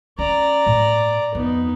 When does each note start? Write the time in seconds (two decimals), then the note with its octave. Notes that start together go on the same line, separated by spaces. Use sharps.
0.19 C#4 D5 A#5
0.67 A2
1.35 F2 B3 D#4